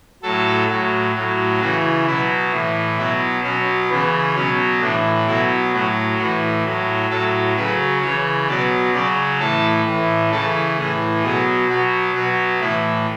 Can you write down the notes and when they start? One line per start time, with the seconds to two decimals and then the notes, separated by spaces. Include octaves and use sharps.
0.23 A2 F#3 A4
0.69 A2 F#3
1.15 A2 F#3
1.60 C#3 E3 F#4
2.06 B2 F#3 E4
2.52 A2 E3
2.98 B2 F#3 E4
3.44 B2 F#3 C#4
3.90 C#3 E3 B3
4.35 B2 F#3 C#4
4.81 A2 E3 D4
5.27 B2 F#3 E4
5.73 A2 F#3 F#4
6.19 A2 E3 F#4
6.65 A2 F#3
7.10 A2 F#3 A4
7.57 C#3 F#3 B4
8.02 C#3 E3 C#5
8.48 B2 F#3 D5
8.94 C#3 F#3 D5
9.39 A2 E3 A4
9.85 A2 E3
10.32 C#3 E3 A4
10.77 A2 E3 G#4
11.23 B2 F#3 G#4
11.69 B2 F#3 F#4
12.15 B2 F#3 F#4
12.61 A2 E3 E4